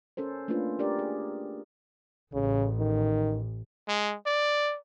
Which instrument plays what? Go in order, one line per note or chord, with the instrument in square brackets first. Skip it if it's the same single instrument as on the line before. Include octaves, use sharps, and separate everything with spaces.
[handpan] C#4 A4 A#4 C5
A3 A#3 C#4 D4 F4 B4
D4 G4 A#4 D5
G#4
[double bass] A1 [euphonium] C#3
[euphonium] D#3
[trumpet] G#3
D5